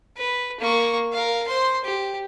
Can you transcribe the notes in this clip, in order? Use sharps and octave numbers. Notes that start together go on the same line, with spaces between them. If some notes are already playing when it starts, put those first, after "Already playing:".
B4
A#3 C#6
A#4 F5
C5 C6
G4